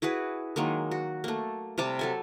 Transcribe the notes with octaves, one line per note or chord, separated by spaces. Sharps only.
E4 F#4 G#4 B4
D#3 F#3 G#3 A#3
F#4
A3 A#3
C3 G3 A5 D6
F#3 A4 G#5